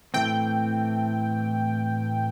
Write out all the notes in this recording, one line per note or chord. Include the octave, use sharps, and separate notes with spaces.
A2 E3 A3 C4 G5